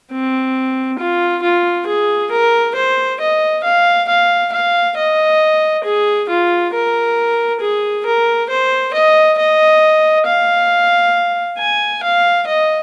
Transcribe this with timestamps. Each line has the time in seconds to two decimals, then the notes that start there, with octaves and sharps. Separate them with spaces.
0.11 C4
0.99 F4
1.43 F4
1.87 G#4
2.31 A#4
2.75 C5
3.20 D#5
3.64 F5
4.08 F5
4.52 F5
4.97 D#5
5.84 G#4
6.29 F4
6.73 A#4
7.61 G#4
8.06 A#4
8.49 C5
8.93 D#5
9.39 D#5
10.26 F5
11.58 G#5
12.03 F5
12.47 D#5